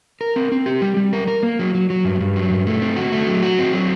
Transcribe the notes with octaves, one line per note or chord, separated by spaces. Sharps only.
A#4
C4
C4
G4
G3
G3
A#4
A#4
A#3
F#3
F#3
F#3
G2
G2
F#3
G2
A3
C4
F#4
A3
F#3
F#4
C4
F#3